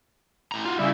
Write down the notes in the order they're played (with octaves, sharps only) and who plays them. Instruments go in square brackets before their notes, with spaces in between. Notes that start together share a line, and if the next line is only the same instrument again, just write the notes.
[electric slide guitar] A2 A#5
F4 F#4
[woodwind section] C#3 E4 E5 [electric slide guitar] G3 C#4